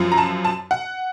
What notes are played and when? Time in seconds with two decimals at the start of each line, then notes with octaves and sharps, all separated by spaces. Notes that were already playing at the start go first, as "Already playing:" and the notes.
Already playing: F#2 F3
0.12 A#5
0.18 A5
0.45 A5
0.71 F#5